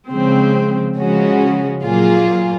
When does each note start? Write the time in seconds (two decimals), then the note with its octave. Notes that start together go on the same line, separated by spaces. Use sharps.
0.10 C#3 F3 G#3 C4
0.97 C#3 F3 G#3 C#4 F#4
1.83 A#2 F#3 A#3 F4 G#4